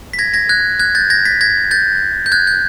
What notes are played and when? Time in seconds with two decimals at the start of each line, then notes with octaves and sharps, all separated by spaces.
0.13 B6
0.19 G#6 A#6
0.34 G#6 A#6
0.49 F#6 G#6
0.79 F#6 G#6
0.95 G6 A6
1.10 G#6 A#6
1.25 A6 B6
1.41 G#6 A#6
1.71 G6 A6
2.26 G6
2.32 F#6 G#6
2.47 G6